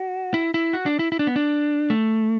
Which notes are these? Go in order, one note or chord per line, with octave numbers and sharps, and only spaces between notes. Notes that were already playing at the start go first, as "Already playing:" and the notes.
Already playing: F#4
E4
E4
F#4
D4
E4
E4
D4
B3
D4
A3